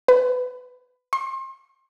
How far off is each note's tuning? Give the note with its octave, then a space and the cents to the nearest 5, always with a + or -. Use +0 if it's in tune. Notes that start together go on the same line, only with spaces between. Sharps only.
B4 +20
C6 +35